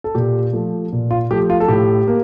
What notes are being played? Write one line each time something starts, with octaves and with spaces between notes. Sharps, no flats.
A4
A#2 G4
F3 A3
A#2
F4
F3 A3 G4
F4
A4
A2 G4
A#3